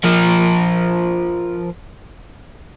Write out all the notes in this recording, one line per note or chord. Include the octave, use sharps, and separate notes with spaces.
F3 A#4